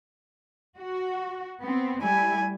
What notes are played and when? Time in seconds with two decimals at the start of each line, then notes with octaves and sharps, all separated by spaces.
0.77 F#4
1.65 B3 C4
2.03 G3 A3 E4 G#5